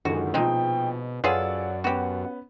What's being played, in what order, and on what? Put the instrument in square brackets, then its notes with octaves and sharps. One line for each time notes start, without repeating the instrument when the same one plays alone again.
[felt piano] C#2 D3 D#3 [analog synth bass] F#2 [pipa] F#4
[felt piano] A#1 F3 [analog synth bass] B2 [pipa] G#3 C4 D#4 [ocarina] G5
[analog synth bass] F#2 [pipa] F4 G#4 A4 [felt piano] B4 C#5 F#5 [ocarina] D5
[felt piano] B3 C#4 [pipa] F#4 G4 [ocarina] F#5